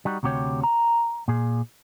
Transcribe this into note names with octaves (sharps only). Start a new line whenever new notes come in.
G3 D#4 F#4
D2 C3 F#4 G4 C#5
A#5
A#2 G#4